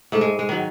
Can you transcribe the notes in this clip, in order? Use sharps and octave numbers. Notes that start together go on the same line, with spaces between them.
G#2 A3
G#3
G#3
D#3 F#3